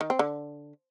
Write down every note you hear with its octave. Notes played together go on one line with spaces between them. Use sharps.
D#3
C4
D3